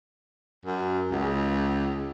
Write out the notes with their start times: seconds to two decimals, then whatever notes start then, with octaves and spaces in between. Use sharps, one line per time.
0.65 F#2
1.11 C#2